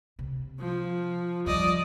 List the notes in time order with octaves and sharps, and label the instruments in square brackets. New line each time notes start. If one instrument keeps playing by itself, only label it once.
[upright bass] C3
[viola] F3
[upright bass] F3 G3 [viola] D5 D#5